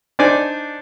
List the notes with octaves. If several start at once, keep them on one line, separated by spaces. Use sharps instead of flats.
D4 D#4 C5 D5 G#5